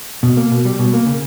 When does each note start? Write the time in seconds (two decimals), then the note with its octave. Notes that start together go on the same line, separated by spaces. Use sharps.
0.23 B2
0.37 A#3
0.51 B2
0.65 G3
0.79 B2
0.93 A#3
1.06 C#3